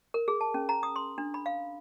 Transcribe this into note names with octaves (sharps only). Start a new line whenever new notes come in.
A#4
G#4
A5
C#4
A#5
D#6
C6
D4
B5
F5